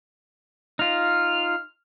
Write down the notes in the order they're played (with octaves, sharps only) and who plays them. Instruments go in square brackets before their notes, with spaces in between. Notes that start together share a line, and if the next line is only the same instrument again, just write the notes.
[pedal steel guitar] D#4 F4 [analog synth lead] F6